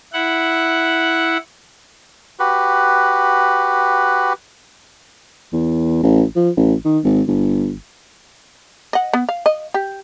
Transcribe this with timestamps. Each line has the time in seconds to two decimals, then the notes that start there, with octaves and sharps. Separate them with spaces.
0.13 E4 F#5
2.39 F#4 G4 B4
5.53 E2
6.03 A1
6.36 F3
6.57 A1
6.85 D#3
7.04 G#1
7.27 G1
8.93 D#5 F#5
9.13 B3
9.29 F5
9.46 D#5
9.74 G4